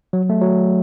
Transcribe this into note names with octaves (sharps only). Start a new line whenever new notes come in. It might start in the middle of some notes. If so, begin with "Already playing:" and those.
F#3
A3
F#3